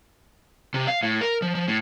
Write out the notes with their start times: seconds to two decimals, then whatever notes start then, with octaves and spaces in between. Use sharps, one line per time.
0.74 C3
0.88 F5
1.03 A2
1.21 A#4
1.42 F3
1.55 F3
1.68 A2